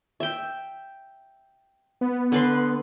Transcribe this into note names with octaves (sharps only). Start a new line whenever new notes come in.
E5 G5
B3
D3 B4 C6